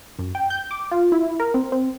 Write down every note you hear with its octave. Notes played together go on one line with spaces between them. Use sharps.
F#2
G5
G6
D6
F4
E4
A#4
C4
C4